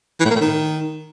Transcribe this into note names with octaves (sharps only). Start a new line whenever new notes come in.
E3
A2
A#3
A2
D#3